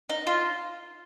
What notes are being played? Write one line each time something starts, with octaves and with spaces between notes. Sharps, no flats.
D#4
F4